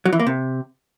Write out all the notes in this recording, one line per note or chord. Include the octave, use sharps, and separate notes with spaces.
F#3
E3
A#3
C3